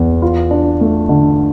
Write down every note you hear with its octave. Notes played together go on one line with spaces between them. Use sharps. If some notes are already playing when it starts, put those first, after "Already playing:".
Already playing: E2
F4
D4
A3
D3